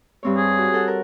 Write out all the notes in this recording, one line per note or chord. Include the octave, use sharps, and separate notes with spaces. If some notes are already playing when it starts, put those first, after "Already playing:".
G2 C4 C#5
G#4
F#4
A4 F#5
A#4